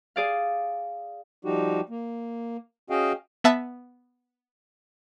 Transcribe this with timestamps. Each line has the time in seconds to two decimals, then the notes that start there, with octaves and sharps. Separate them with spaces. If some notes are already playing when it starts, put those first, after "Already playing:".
0.16 G#4 D5 F5
1.45 F3 G3 D#4 F#4 G4
1.89 A#3
2.90 C#4 F#4 G#4 D#5 F5 G5
3.44 B3 E5 A5 B6